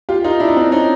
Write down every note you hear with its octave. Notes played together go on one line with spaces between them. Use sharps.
F4 G4
D#4 F4
D4 E4
D#4
C4 D4
C#4 D#4